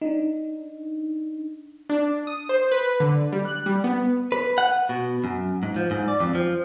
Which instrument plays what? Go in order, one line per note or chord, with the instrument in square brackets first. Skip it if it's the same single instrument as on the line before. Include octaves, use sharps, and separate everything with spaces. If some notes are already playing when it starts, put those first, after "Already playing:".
[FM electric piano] D4 D#4
[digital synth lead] D4
D#6
C5
B4
D3
G3
F#6
G3
B3
[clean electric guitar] B4
F#5
B2
F#2
G#2
F3
G#2
D5
F2
F3